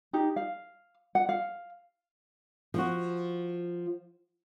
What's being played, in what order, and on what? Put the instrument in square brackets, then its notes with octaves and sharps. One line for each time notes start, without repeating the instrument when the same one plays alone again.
[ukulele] D#4 G4
F5
F#5
F5
[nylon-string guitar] F3 F#4